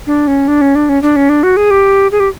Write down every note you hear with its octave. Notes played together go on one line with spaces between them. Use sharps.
D4
C#4
D4
C#4
D4
C#4
D4
C#4
D4
F#4
G#4
G4
G#4
G4